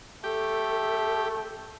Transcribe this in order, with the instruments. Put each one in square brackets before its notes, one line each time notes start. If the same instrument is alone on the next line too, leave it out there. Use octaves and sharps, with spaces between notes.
[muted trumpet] A3 [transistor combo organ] G4 [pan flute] A4